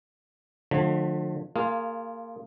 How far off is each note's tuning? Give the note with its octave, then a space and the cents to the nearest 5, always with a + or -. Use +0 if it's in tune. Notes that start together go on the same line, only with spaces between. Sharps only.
D3 +30 F3 +35 A3 +0
A#3 -25 F4 +0 G#4 +0